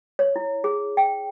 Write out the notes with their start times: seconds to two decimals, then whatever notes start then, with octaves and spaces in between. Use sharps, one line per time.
0.19 C#5
0.36 E4
0.64 G#4
0.97 G5